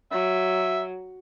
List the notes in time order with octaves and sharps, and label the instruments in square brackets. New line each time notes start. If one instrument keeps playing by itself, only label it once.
[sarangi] F#3 [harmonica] E5